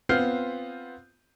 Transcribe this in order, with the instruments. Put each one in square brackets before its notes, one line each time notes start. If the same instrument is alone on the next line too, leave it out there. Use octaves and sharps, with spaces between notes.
[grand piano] B3 C4 F4 F6 G6 C7